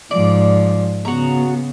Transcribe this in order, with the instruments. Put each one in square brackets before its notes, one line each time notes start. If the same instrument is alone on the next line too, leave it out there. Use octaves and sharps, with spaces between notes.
[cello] G#2 F3 [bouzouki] D5
[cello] C#3 B3 [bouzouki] F#4 A#5